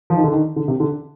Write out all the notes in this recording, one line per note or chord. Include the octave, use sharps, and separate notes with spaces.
F3
D#3
D3
D#3
D3
C3
D3